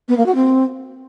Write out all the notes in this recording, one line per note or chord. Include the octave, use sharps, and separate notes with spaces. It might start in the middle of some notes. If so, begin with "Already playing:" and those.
B3
A#3
F#4
C4